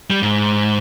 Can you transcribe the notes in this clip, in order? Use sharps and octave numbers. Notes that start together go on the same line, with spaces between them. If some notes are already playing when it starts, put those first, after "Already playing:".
G3
G#2